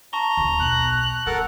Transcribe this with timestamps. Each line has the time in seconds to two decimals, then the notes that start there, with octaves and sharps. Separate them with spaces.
0.13 A5 A#5 C#6 G7
0.37 D#2 C#3
0.59 B1 F#6
1.26 G3 A4 A#4 F#5